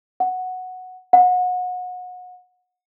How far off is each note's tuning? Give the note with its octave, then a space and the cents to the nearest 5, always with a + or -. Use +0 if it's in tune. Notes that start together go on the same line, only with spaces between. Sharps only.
F#5 -5
F#5 -30